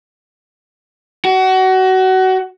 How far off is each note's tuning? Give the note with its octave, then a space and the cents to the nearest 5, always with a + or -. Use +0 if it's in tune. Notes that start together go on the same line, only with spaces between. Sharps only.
F#4 +25